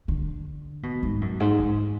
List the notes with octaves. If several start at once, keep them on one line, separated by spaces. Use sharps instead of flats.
D3
B2
G#2
F#2
G#2
G#2